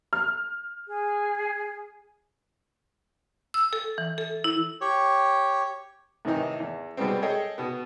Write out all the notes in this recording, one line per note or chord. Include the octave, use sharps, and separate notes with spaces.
F6
G#4
E6
A4
E3
A4
E4
G4 C#5
A2 C3 D#3 E3 D#4
E2
B2 G3 G#3 B3 C4
G#4 A4 C#5 D#5 G5
B2 B3